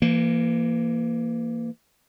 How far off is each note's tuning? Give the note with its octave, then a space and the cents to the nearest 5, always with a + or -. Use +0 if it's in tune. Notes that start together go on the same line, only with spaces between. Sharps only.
E3 +30 A#3 -10